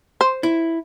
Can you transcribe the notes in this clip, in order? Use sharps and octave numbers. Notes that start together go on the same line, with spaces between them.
C5
E4